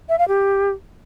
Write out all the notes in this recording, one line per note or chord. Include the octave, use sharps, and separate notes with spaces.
E5
F5
G4